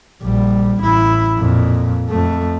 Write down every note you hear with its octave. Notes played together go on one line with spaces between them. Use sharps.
A#1 G3
A1 E4
F2 A#2
F2 A3